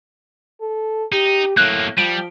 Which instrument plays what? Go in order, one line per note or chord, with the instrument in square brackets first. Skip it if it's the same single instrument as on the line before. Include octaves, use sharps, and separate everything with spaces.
[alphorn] A4
[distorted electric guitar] D#4 [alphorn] G4
[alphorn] A2 [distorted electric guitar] F#3 A#3 [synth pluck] F#6
[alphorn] F3 [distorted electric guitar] G3 [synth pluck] D7